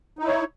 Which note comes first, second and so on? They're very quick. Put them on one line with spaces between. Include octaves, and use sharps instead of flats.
D#4 E4 C#5